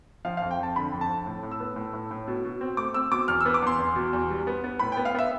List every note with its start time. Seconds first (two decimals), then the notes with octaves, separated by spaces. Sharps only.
0.25 F3 F5
0.37 F5
0.42 F2
0.51 G5
0.59 F2 A5
0.76 D3 B5
0.93 F2
1.01 A5
1.09 F2
1.26 A2
1.43 A2
1.51 E6
1.60 B3
1.76 A2
1.93 A2
2.11 A2
2.28 B2
2.45 B2
2.61 C4
2.77 A3 D6
2.94 C4 E6
3.11 B2 D6
3.28 E2 F6
3.41 E6
3.46 B3
3.54 D6
3.62 E2 C6
3.78 E2
3.96 B2
4.13 E2
4.30 G3
4.47 B3
4.64 B3
4.79 A2 B5
4.92 G5
4.97 B3
5.05 F5
5.14 B3 E5